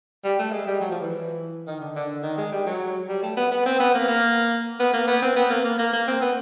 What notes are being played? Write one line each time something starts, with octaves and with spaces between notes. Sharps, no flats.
G3
A3
G#3
G3
F#3
F3
E3
D#3
D3
D3
D#3
G#3
G3
F#3
G3
A3
B3
B3
C4
B3
A#3
A#3
B3
A#3
B3
C4
B3
A#3
A#3
A#3
A#3
C4
B3